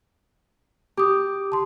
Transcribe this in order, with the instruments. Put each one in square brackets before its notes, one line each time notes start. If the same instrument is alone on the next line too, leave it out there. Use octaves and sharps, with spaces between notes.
[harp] G4 [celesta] D6 D#6
[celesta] A5 C6